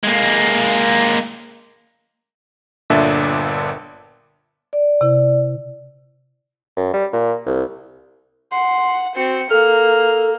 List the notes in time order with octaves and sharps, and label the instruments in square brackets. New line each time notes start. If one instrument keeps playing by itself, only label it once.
[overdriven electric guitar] G#3 A#3
[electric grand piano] G1 A#2 D3 D4 A4 E5
[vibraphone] D5
[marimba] C3 E4
[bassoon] F#2
G3
A#2
C2
[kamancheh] F#5 [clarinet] C6
[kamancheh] C4 [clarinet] F#4 [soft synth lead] C#7
[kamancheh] A#3 [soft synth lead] A4 [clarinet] F6